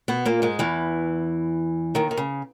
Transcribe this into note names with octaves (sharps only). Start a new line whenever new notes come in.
B2 B3
A#2 A#3
G#2 G#3
E2 E3
D#2 D#3
D#3
C#3